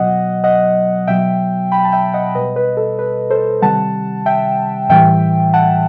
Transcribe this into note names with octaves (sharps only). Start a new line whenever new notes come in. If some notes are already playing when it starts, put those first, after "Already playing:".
Already playing: B2 F#3 D#5 F#5
D#5 F#5
B2 F#3 E5 G5
G5 B5
A5
E5 G5
D#5 F#5
B2 G3 B4 D#5
B4
A4
B4
A4 C5
C3 D#3 G3 F#5 A5
E5 G5
A2 E3 G3 E5 G5
F#5 A5